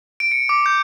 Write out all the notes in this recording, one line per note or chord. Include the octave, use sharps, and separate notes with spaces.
D7
C#7
D6
G6